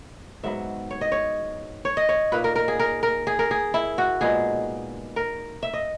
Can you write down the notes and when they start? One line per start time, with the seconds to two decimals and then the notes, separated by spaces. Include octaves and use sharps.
0.43 G#2 F#3 B3 E5
0.91 C#5
1.01 D#5
1.12 C#5
1.85 C#5
1.97 D#5
2.09 C#5
2.32 A#2 A#3 D#4 B4
2.44 A#4
2.56 A#4
2.68 G#4
2.79 A#4
3.03 A#4
3.27 G#4
3.39 A#4
3.51 G#4
3.74 E4
3.98 F#4
4.21 A#2 G#3 B3 D#4 G#4
5.16 A#4
5.63 E5
5.73 D#5